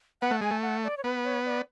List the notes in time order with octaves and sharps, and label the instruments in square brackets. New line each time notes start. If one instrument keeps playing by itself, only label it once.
[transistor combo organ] B3 [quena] F#5
[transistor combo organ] A3
[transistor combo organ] G#3 [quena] G#5
[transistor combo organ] A3
[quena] F#5
D5
C#5
[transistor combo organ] B3 [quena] B4
[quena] C#5
D5